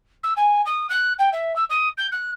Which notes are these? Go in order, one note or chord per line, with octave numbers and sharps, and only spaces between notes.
E6
G#5
D#6
F#6
G5
E5
E6
D#6
G6
F#6